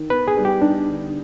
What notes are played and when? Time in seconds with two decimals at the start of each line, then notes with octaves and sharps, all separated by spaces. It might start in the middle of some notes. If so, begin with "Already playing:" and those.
Already playing: D#3
0.10 B3 B4
0.28 G#4
0.37 G3
0.45 G4
0.61 D4 D#4
0.87 D3